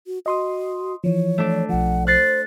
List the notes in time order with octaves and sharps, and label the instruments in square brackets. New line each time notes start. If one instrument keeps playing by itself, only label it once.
[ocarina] F#4
[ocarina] F#4 [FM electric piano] D#5 C6 D#6
[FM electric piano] E3 F3 [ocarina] C#5
[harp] A3 D4
[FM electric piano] B1 F3 [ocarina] F#5
[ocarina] C5 [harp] F#6 A6 C7